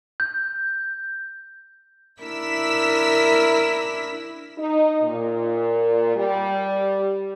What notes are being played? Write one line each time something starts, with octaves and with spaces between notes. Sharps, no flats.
G6
D4 E4 A#4 E6 B6
D#4
A#2
G3